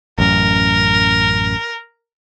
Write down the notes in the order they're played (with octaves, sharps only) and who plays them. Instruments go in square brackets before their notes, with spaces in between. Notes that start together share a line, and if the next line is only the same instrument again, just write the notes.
[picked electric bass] A1 F#2 [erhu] A#4